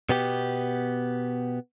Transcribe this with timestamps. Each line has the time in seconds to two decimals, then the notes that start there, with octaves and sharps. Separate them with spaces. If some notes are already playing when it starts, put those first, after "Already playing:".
0.09 B2 B3 G4